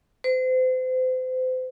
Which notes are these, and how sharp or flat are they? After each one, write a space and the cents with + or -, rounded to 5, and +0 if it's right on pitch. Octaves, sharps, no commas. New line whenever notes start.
C5 -35